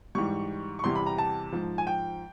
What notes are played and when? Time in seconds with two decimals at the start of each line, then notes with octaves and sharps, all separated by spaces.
0.15 G#2 E3 G3 C#6
0.79 C#6
0.84 E2 C3 E3 G3 C6
0.95 B5
1.06 A#5
1.18 A5
1.53 G#2 F3
1.78 G#5
1.87 G5